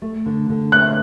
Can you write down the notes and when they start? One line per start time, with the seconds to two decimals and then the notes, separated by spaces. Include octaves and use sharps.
0.02 A3
0.26 D3
0.49 D3
0.72 A3 F#6